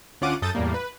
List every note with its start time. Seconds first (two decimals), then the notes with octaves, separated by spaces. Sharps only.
0.21 D2 C#4 F4 F#5 D6 D#7
0.42 F#2 A4 D#6 G6 A6
0.55 E2 A2 G3 A#3
0.74 B4